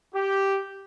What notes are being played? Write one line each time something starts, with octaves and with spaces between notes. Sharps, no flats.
G4